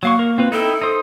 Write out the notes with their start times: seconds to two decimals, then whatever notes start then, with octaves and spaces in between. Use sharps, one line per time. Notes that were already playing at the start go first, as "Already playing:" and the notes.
0.03 F#3 A#3 F5 C#6
0.19 A#4
0.38 C4 F4 B4
0.52 D#4 E4 A4 G5
0.81 D#4 C5 D#6